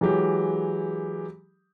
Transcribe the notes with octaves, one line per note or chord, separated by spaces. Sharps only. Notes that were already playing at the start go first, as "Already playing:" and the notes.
E3 F#3 G#3 G4